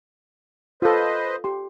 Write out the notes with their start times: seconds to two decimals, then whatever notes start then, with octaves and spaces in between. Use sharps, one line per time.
0.82 F4 A4 B4 C5 D#5
1.44 G4 C6